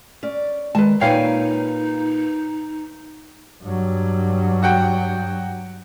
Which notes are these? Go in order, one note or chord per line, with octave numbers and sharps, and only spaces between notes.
C#4 D5
D#3 G#3 B4 A5
A#2 D#4 B4 C#5 F5 G5 G#5
G2 F#3
F#4 F#5 G5